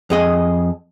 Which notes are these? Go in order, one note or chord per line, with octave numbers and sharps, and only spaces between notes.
F2 G#4 D#5